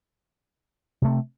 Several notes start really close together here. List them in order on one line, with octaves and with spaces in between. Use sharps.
C3 A3 C4